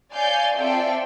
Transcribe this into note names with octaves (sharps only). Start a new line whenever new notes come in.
C#5 D5 F5 G#5 G6 A6
C4 F4 A4 D5 E5 G5